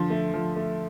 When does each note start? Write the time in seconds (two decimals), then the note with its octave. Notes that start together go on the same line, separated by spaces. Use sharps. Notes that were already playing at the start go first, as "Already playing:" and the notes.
Already playing: D3 F3
0.10 A3
0.34 F3
0.56 A3